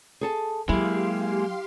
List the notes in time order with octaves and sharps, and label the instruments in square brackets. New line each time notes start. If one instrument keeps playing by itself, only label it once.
[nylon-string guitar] G#4 A4 A5
[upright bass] F#3 [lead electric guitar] G#3 A#3 [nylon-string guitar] E4 [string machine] G4 F5 C6